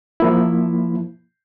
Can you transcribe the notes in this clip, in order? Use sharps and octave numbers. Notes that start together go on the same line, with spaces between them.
F3 A#3 E4